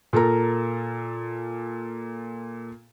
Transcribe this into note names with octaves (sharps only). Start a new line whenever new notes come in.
A#2 A4 A#4 A#5